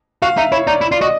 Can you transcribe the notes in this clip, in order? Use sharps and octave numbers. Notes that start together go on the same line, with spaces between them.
F#4 F5
D#4 E5
E4 C#5
D#4 D5
E4
F4 D5
F#4 D#5